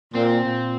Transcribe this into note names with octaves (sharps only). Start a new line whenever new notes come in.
A#2 C4
A#2